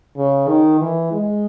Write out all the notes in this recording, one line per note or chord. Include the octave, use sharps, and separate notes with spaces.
C#3
D#3
E3
G#3